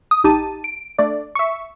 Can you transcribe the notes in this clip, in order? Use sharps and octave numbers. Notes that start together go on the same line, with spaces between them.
D#6
A#1 D#4 G4 A5 D#7
D7
A3 D4 D5
E5 C#6